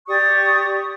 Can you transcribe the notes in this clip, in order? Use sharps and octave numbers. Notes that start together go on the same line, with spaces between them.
G4 D5 C#6 D#6